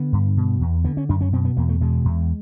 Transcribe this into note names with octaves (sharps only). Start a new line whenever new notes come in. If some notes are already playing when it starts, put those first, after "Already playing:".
Already playing: D3 B3
G2
B2
E2
D3 B3
C#4
F#2 D4
C#4
B2 C4
B3
E2 A#3
A3
B2 G#3
E2